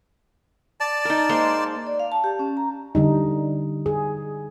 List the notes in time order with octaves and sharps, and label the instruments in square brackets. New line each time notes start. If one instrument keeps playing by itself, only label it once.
[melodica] D5 A5
[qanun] D#4 A#4
G#3 A#3 C5
[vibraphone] D5
F5
A5
G4
C#4
A#5
[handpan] D3 G3 D#4
G#4